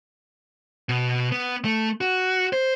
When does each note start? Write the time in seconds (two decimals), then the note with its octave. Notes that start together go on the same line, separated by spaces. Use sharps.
0.89 B2
1.32 B3
1.65 A3
2.01 F#4
2.53 C5